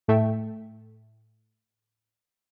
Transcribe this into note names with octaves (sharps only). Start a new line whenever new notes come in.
A2 A3 E5 G5